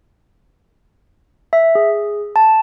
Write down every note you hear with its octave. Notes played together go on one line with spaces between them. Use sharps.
E5
G#4
A5